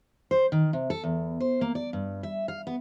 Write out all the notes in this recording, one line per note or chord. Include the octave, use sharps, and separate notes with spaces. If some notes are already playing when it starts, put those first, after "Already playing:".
C5
D#3
C3
A4
E2
C5
A#3
D5
G2
E5
F5
B3